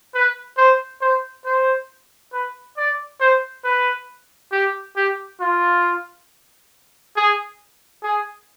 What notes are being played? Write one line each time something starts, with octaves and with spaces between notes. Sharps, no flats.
B4
C5
C5
C5
B4
D5
C5
B4
G4
G4
F4
G#4
G#4